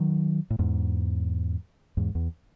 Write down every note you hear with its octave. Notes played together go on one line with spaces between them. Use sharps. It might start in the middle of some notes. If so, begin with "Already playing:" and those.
Already playing: D#3 F#3
A2
E2 G#2
E2 G#2
E2